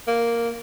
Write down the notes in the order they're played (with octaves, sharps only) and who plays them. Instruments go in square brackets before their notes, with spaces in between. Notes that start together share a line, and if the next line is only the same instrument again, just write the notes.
[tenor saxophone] A#3